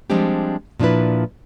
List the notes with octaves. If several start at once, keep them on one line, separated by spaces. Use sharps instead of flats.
F3 G3 G#3 C4 D4 G4
A#2 F3 D4 E4 B4